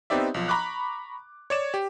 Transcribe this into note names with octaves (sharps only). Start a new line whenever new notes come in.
B3 C4 D#4 G4 D5 E5
B1 F3
A#5 B5 C#6 D6 F#6
C#5 D5 E7
G4